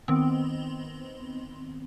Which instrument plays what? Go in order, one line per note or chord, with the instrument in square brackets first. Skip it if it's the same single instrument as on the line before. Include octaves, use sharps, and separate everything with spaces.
[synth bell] D#3 B3 C4